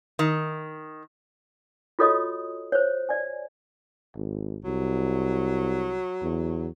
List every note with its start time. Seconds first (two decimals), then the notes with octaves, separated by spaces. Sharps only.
0.19 D#3
1.99 F4 F#4 A4 C#5 D#5 D#6
2.72 C5 C#5
3.09 D5 G#5
4.16 G#1
4.65 C2 F#3
6.22 E2